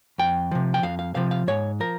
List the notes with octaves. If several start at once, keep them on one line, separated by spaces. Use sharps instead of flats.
F2 G5
C3 F3
G5
F2 F5
F5
C3 F3 F5
F5
G#2 C#5
F3 A#4